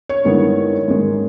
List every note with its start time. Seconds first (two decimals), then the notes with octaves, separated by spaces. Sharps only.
0.09 C#5
0.24 G2 D#3 G#3 B3 E4
0.88 G#2 D#3 G#3